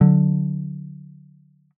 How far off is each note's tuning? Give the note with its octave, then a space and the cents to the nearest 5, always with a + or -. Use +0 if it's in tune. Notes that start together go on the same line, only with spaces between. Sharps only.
D3 +0 F#3 -20